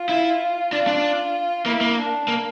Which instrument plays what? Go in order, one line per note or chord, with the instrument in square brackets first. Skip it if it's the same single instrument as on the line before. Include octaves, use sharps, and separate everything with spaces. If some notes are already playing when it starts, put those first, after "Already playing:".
Already playing: [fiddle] F4
[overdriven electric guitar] E4
[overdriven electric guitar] D4 [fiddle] F4
[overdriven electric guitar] D4
[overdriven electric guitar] A#3 [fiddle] E4
[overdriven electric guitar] A#3
[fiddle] D4
[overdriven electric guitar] A#3